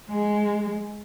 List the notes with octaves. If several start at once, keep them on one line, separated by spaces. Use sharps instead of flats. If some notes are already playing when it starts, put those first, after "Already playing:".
G#3